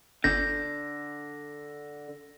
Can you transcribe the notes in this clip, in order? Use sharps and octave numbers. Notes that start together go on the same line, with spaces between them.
G1 D3 G6 A#6